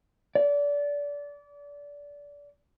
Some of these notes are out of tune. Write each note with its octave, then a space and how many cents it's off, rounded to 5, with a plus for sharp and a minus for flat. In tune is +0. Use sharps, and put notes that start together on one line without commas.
D5 -25